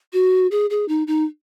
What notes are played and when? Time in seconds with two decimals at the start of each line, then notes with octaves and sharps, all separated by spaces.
0.13 F#4
0.51 G#4
0.70 G#4
0.88 D#4
1.07 D#4